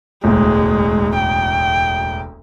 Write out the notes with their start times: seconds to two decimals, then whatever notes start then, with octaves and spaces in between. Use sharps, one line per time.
0.24 E1 A1 D2 G#3
1.15 G5